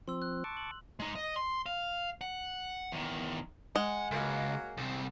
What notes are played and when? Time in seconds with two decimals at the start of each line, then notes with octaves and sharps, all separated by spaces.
0.08 F3 C4 C6 E6
0.22 F#6
0.44 A5 C#6 D6
0.57 F#7
1.00 G#3 D#4
1.16 D#5
1.36 C6
1.66 F5
2.21 F#5
2.92 E2 D#3
3.76 G#3 F#5
4.11 C#2 F#3 A#3
4.77 C2 C3